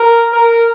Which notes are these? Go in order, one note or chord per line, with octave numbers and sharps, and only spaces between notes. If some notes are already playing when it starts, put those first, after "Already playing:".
Already playing: A#4
A#4